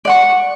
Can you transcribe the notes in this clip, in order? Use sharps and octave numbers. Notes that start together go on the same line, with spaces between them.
D5 F#5 C#6